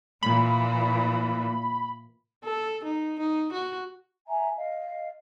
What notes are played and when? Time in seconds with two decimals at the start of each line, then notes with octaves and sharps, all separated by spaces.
0.23 A#2 E3 B5
2.44 A4
2.84 D#4
3.19 D#4
3.53 F#4
4.27 E5 G#5 A#5
4.57 D#5 F5